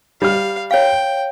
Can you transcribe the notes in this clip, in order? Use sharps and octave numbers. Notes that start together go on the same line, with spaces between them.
G3 F5 F6
C#5 F5 G5